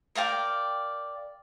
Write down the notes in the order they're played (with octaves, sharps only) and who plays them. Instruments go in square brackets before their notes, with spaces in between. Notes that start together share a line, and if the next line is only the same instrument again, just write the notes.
[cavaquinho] A#4 D5 F5 G5